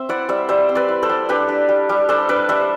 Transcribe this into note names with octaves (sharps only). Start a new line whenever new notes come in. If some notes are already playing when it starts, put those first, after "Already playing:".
Already playing: C4 C5 E5
E4 D5 F#5
G3 C5 E5
G3 C5 E5
C4
B4 D5
E4
A4 C5
G3
D4 G4 B4
D4
G3
G3
D4 A4 C5
D4 B4 D5
G3 C5 E5